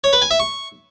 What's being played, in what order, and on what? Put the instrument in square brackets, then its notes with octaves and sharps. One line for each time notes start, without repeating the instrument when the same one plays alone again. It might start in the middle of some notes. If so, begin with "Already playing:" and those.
[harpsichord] C#5
B4
G#5
E5
C#6